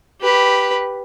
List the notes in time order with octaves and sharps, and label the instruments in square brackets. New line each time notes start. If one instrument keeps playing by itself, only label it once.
[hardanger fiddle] G4 B4